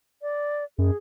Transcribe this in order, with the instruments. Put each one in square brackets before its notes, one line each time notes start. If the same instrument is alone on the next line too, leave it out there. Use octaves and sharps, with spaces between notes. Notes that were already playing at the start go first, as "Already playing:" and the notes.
[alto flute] D5
[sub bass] F#2 [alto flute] G#4